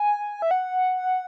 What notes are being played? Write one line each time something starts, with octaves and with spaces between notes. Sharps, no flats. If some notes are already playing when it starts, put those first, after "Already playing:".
Already playing: G#5
E5
F#5